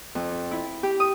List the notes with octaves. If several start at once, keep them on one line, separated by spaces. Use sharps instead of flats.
F2
E4
G4
D#6